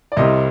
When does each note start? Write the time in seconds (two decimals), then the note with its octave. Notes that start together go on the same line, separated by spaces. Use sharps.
0.12 D5
0.17 C2 C3 G3 D#5